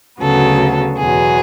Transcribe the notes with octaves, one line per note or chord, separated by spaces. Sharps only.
D2 C#3 F#3 B3 A4
E2 B2 F#3 B3 G#4